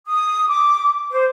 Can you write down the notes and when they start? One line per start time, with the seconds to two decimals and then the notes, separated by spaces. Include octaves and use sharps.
0.06 D#6
0.47 D6
1.12 C5